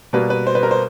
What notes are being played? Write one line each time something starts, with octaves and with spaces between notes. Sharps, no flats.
B2 G3 A#3 B4
B4
C5
B4
A#4
C5